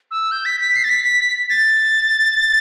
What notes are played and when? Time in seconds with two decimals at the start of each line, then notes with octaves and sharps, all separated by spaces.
0.11 E6
0.31 G6
0.45 B6
0.60 B6
0.76 C7
0.84 A6
0.90 B6
1.04 B6
1.20 B6
1.49 A6